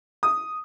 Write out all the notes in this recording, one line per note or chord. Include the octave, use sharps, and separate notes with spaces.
D#6